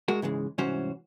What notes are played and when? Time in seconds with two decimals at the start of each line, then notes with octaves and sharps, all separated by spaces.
0.08 G#3 F#4 A#4
0.22 G#2 C#3 E3 G#3
0.58 C2 G#2 E3 C#4 F#4 C5